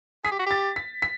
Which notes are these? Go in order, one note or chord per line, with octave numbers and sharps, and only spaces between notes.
G#4 B6
G4
F#4
G4 A6
B6
B6